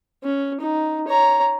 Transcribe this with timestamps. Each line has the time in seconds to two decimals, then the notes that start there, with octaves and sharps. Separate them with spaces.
0.23 C#4
0.60 D#4
1.07 C#5 A#5